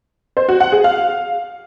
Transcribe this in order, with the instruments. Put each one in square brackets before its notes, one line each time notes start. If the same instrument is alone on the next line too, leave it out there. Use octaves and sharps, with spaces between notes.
[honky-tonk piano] C5
F#4
F#5
G#4
F5